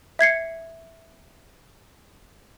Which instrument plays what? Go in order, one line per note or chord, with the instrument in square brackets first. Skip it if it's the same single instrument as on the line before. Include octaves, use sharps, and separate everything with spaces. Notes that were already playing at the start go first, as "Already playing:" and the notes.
[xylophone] E5 G#6 C7 C#7